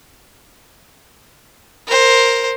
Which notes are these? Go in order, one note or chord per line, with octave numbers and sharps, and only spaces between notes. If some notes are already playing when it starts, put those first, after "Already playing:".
A#4 C5